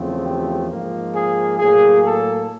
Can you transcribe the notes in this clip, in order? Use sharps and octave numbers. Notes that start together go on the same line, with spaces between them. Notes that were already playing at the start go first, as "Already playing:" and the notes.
Already playing: E2 C#3 F3 A3 C4
G4
G#2 F3 A#3
G#4
A2 F#3 A#3 G#4
A4